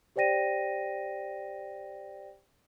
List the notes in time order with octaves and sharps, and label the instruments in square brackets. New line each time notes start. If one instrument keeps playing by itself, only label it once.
[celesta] G4 C5 D5 G5 A#6 D#7